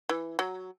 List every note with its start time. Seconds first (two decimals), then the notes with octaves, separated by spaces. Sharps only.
0.09 E3
0.39 F#3